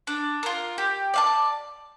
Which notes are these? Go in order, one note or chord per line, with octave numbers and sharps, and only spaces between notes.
D4
F4 A#4
G4
D5 F5 A5